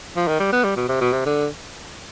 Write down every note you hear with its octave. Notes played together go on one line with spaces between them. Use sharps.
F3
D#3
G3
B3
G3
B2
C3
B2
C3
D3